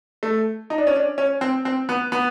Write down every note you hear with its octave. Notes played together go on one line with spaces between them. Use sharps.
A3
D#4
D4
C#4
D4
C#4
C4
C4
B3
B3